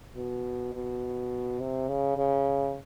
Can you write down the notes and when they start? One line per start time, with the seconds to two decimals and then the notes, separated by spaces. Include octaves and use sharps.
0.16 B2
0.74 B2
1.60 C3
1.88 C#3
2.17 C#3